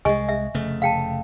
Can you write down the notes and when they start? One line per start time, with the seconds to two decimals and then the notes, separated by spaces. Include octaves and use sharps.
0.05 C2 G#3 D#5 G#5 C#6
0.29 E5
0.54 F1 C#3 A3
0.82 F5 G5 A5